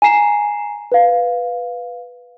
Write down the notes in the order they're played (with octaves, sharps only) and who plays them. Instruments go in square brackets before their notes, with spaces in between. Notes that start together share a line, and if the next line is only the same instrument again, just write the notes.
[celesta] G#5 A#5 C7 E7
B4 F5